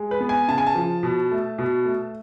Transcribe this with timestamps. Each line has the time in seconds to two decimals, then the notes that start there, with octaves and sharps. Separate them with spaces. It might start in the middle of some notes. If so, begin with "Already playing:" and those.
Already playing: G#3
0.11 B4
0.20 B3
0.29 G#5
0.48 C#3 A5
0.58 G#5
0.67 A5
0.75 F3
1.03 B2
1.31 A3
1.58 B2
1.85 A3